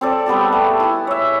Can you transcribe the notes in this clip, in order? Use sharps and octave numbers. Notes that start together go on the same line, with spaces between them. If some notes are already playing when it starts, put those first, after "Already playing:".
C4 A4 D5
G3 B3 G4 A4
A3
E4 G#5
C#5 E5